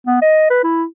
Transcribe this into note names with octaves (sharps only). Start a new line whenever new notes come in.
B3
D#5
B4
E4